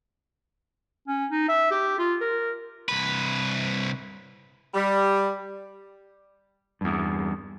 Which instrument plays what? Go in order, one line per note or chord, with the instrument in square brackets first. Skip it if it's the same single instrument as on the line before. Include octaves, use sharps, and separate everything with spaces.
[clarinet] C#4
D#4
E5
G4
F4
A#4
[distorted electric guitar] C2 B4
[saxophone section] G3
[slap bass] E2 G2